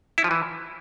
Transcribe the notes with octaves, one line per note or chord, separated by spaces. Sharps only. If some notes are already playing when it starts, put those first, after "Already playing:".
E4
F3
E3